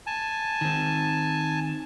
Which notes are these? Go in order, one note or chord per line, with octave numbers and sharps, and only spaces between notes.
G#5 A5
D#3 C4